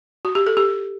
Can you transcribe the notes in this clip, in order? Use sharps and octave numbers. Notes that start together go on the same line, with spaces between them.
F#4
G4
A4
G4